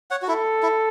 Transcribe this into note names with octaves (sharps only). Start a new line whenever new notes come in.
C#5 F#5
F#4
E4 A4
E4